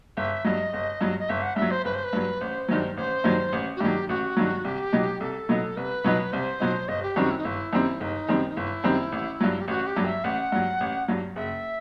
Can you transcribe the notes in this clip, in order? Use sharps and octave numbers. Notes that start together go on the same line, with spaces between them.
G1 E5
G2 F#3 D#5
G1
G2 F#3
D#5
G1 E5
F#5
G2 E5
F#3
C5
G1 B4
C5
B4
G2 F#3
A1 C5
G2 D#3 F#3
A1 C5
G2 D#3 F#3
A1
F#4
G2 D#3 F#3 G4
A1 F#4
G2 D#3 F#3
C2 G4
B2 F#3 B3 D#4
C2 A4
B2 F#3 B3 D#4
C2 B4
B2 F#3 B3 D#4
C2 C5
B2 F#3 B3 D#4
G1 D#5
G4
F#2 D#3 G3 C4 F#4
E4
D#4
G1 E4
F#2 D#3 G3 C4
G1 D#4
F#2 D#3 G3 C4
D#4
G1 E4
F#2 D#3 G3 C4
A1
G2 F#3
G4
A1 F#4
G4
G2 F#3
E5
A1 F#5
G2 F#3
A1
G2 F#3
F#1 E5